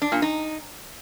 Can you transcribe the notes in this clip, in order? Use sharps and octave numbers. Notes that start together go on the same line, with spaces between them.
D4
A#2
D#4